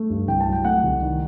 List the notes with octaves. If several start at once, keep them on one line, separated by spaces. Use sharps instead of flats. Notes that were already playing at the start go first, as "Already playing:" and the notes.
Already playing: A3
G2
C2 G5
A5
F#3
G5
A3 F#5
C2
D#3